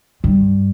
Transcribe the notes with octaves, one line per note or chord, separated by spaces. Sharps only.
G2